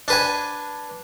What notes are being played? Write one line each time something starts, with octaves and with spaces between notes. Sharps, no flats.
D4 B4 G#5